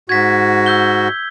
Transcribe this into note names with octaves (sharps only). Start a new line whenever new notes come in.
G#2 F#4 G#6 B6
E6 G6 G7